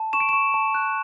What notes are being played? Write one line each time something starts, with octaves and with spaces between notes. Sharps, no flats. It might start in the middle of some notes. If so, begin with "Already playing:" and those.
Already playing: A5
C#6 E7
D7
C#6 E7
A5
F#6